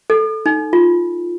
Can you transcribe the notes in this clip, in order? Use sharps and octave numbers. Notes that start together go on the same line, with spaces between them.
A4
D#4
F4